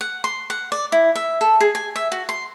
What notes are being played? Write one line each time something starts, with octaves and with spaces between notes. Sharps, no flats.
F#5
C6
F#5
D5
E4
E5
A4
G#4
G#5
E5
F#4
C6